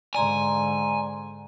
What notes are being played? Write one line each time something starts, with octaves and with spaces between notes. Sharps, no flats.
G#2 D3 D5 G#5 A#5 C6